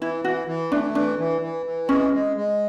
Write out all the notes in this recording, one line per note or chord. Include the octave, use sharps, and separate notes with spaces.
E3 E4
E3 F#4
E3
A3 D4
E3 D4
E3
E3
E3
G#3 C#4
G#3
G#3